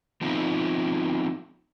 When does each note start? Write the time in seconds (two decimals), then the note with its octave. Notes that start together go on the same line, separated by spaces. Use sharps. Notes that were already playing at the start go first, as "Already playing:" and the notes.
0.21 F3 B3 C4 D#4 F4